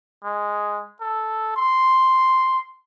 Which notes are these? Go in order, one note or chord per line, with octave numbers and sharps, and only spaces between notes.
G#3
A4
C6